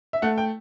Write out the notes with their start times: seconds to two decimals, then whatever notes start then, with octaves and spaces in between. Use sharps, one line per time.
0.13 E5
0.22 A3 F#5
0.38 G5